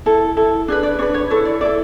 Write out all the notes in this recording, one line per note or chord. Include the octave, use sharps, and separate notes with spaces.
E4 A4
E4 A4
D4 G#4 B4
D5
D4 G#4 B4 C#5
C#5
E4 A4 C#5
D5
E4 A4 D5